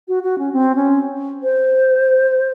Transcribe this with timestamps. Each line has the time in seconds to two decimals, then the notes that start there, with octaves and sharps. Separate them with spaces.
0.08 F#4
0.23 F#4
0.39 C#4
0.53 C4
0.76 C#4
1.43 C5